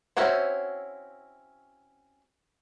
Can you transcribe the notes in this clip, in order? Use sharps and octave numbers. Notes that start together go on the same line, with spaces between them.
C4 C#4 E4 F#4 C5